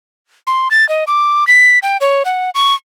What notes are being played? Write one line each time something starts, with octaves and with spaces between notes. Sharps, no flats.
C6
A6
D#5
D6
B6
G5
C#5
F#5
C#6